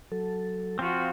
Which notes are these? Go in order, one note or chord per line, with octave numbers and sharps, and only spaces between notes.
F#3 A4
F3 C4 F4 F#4